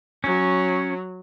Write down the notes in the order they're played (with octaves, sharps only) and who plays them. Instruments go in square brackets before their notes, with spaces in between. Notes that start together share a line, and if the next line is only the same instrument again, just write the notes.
[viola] F#3 [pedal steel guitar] C#4